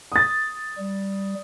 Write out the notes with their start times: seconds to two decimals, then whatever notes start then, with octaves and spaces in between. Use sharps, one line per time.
0.12 D#6 A6
0.78 G3